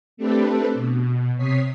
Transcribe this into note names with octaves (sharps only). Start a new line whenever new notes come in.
A3 C4 D4 G4 A4 B4
B2
C3 C#5 D#6 B6 C7